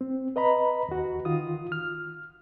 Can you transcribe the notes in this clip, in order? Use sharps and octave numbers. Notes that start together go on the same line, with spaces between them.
C4
B4 D#5 A#5 B5
D#2 F#4
D#3 F4 D#6
F6